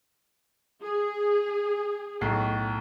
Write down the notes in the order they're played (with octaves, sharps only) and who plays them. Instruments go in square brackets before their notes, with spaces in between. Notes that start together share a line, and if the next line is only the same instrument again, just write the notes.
[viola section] G#4
[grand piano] B1 A2 C7